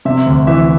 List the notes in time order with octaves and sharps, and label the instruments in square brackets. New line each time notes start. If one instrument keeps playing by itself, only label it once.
[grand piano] C3 E5
D2
E3 E5